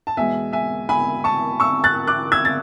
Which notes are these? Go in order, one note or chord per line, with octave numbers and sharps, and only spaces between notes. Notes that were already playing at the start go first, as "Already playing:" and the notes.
A5
E2 B2 G#3 E5 G#5
E5 G#5
G#5 B5
A5 C#6
C#6 E6
F#6 A6
D6 F#6
E6 G#6
A6